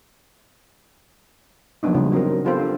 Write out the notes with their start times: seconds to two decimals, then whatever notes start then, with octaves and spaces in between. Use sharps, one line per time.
1.83 F3 F#3 A#3 B3 D4 D#4
1.95 C#3 G3 F4
2.12 F#3 C4 D#4 A#4
2.45 B3 C4 F4 G4 A4 C5
2.60 D4